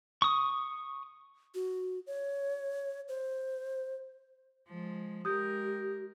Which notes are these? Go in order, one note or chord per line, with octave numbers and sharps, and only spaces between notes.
C#6 D#6
F#4
C#5
C5
F3 G#3
G#3 G4 A#4 D#6 G6